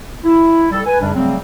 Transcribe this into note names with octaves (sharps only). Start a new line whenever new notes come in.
E4
G3 A4
B4 G#5
F#2 C#3 G3 D4
C#3 F#3 G3 A3 C4